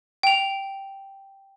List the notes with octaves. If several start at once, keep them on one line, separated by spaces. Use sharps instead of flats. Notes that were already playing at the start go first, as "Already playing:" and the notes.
G5 F7